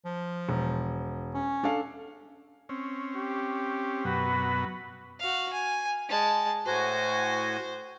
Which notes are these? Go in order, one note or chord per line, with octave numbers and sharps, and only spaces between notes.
F3
E1
C#4
D4 A4 F5
C4 C#4
G4
F#2 B2 F#3 F#4 B4 B5
F#4 F5
G#5
G#3 A5
A2 F#4 C5 G#5